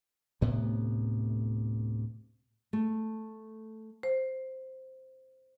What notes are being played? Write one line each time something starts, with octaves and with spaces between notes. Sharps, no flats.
D2 A2 C3 B3
A3
C5